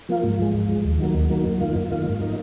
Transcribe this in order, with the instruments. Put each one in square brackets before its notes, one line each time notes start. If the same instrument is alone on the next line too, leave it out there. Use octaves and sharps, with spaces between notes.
[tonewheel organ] F3 A#3 F4
G#2
F3 G#3
G#2
F3 G#3
D#2
D#3 F#3 A#3
D#2
D#3 F#3 A#3
F#2
D#3 A#3 F4
F#2
D#3 A#3 F4
G#2
F3 A#3 D#4